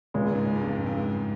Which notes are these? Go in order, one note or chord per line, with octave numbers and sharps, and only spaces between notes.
C#2 A#2 C#3 G#3
G#2
G2
F2
G2
G2
G#2